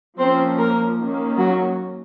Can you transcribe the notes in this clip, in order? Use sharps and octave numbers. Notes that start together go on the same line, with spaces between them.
F3 A#3 C4 C#4 C5
A#3 A#4
D#3 A#3 C#4
F#3 F#4